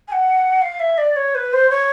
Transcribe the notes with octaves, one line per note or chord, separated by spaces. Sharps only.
G#5
F#5
F5
E5
D5
C#5
B4
C5
C#5